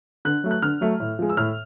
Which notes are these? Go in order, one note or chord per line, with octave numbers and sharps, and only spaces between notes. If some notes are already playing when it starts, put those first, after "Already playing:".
D3 F#6
F#3 A3
F#6
D3 F6
F#3 A3
A2
F3 G#3
E6
A2 F6